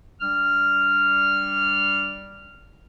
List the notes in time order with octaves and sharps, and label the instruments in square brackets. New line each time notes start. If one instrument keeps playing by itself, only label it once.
[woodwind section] G3 D4 F6